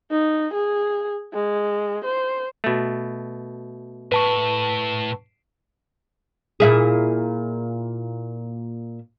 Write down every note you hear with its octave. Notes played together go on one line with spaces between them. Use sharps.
D#4
G#4
G#3
C5
B2 A3
A2 E4 B4 A5 C#6
A#2 E4 G#4